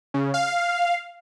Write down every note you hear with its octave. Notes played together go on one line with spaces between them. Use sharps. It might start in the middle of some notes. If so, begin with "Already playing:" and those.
C#3
F5